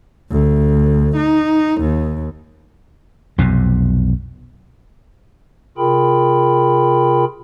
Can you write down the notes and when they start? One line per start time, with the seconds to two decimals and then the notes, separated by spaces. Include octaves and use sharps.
0.31 D2
1.17 D#4
1.82 D#2
3.38 B1 F2 C3
5.78 C3 F4 G#4 A#4 G5 B5